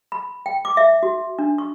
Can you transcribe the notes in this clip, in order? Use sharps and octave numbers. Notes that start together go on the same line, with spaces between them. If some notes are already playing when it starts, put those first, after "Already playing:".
B5
G5
D6
E5
F#4
D4
C#6